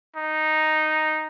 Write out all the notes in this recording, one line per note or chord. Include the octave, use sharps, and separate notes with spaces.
D#4